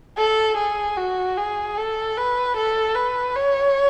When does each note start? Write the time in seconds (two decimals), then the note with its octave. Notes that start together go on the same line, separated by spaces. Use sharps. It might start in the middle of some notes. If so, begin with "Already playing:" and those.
0.18 A4
0.57 G#4
0.98 F#4
1.37 G#4
1.77 A4
2.17 B4
2.57 A4
2.96 B4
3.35 C#5